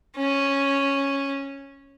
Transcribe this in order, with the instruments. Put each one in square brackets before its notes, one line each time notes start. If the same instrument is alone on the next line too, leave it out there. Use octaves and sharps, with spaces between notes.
[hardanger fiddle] C#4